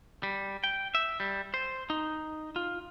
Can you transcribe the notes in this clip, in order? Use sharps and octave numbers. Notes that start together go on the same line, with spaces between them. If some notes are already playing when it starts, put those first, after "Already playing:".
G3
G5
E5
G3
C5
D#4
F4